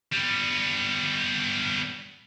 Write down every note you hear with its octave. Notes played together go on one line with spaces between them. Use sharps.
G3 B3